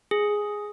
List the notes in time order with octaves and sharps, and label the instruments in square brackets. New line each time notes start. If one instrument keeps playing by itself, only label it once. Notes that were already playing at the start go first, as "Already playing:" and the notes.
[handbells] G#4